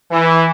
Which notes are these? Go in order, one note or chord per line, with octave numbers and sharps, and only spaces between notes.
E3